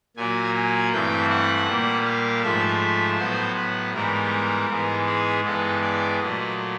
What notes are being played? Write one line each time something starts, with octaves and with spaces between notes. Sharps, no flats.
A#2 F#3 A#3 G#5
G#5
G2 E3 A3 C4 G5
F#5
A#2 G3 A#3
F5
G#2 F3 A3 E5
A2 F#3 B3 C5
B4
G#2 E3 G3 B3 A#4
G#2 E3 G#3 B3
G#4
G2 E3 G#3 B3 A4
D5
A#2 F#3 A3 D#5